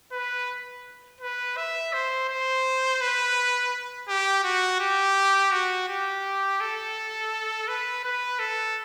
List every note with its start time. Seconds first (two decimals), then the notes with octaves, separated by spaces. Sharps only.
0.12 B4
1.21 B4
1.57 E5
1.93 C5
2.29 C5
3.01 B4
4.09 G4
4.44 F#4
4.80 G4
5.52 F#4
5.89 G4
6.61 A4
7.68 B4
8.04 B4
8.39 A4